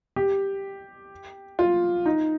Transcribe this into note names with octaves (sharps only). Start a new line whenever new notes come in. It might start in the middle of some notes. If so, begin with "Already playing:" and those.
G4
F4
D#4